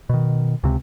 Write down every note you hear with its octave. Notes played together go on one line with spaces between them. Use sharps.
B2 D#3
C#2 C3